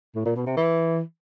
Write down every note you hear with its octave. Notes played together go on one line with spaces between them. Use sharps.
A2
A#2
B2
C3
E3